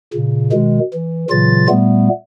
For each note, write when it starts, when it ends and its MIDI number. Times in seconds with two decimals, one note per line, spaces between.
0.14 0.51 46
0.14 0.51 49
0.52 0.79 47
0.52 0.79 51
0.52 0.79 56
0.93 1.25 52
1.30 1.67 46
1.30 1.67 49
1.30 1.67 52
1.30 1.67 54
1.30 1.67 65
1.30 1.67 93
1.69 2.09 46
1.69 2.09 55
1.69 2.09 57
1.69 2.09 59